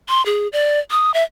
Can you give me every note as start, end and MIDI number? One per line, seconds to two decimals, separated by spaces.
0.09 0.24 84
0.26 0.48 68
0.53 0.79 74
0.91 1.14 87
1.14 1.24 76